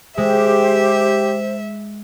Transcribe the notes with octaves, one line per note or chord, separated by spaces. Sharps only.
G#3 G4 C5 E5